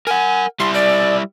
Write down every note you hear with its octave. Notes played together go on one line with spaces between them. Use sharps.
A#4 F#5 G#5
G3 E4 C6
D5